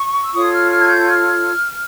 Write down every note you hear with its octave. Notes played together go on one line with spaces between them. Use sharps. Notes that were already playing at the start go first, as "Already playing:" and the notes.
Already playing: C#6
E6
F4 A4 C#5 D#6
F6
F6
G#6
G6
F6